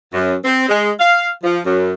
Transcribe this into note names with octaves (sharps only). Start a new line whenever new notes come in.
F#2
C4
G#3
F5
F3
F#2